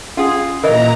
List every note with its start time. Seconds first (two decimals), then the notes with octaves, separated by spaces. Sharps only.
0.17 C#4 F4 G#4 F#5
0.64 A#2 E3 A#4 D#5 E5 A#5